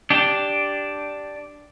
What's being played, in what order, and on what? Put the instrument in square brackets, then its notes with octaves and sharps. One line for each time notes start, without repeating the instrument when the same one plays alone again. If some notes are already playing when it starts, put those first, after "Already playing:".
[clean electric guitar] D4 G4